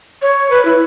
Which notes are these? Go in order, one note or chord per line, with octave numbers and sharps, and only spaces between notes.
C#5
B4
E4